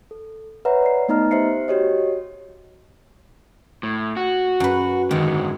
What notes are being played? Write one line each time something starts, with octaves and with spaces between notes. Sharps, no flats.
A4
B4 C#5 E5 F#5 A#5
D5 C7
A3 B3 D#4 D#5 A#5 F6
G4 C5 E5 C7 C#7
F#4 G4 C#5 D#5
A2
F#4
F#2 B4
G#2 D3 D#3 F#4